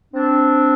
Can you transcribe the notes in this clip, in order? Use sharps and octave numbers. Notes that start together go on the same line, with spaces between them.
C4 D4